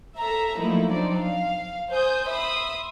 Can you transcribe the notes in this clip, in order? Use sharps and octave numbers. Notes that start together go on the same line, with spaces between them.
A4 E5 A#5
F3 F#3 A3 A#3 D#4 E4
C4 D4 D#4 D5
F5
C5 G#5 D#6 G6
E5 B5 C6 D#6